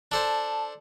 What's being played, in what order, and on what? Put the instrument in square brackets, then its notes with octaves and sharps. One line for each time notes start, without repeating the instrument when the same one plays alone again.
[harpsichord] D4 A4 C5 [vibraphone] A5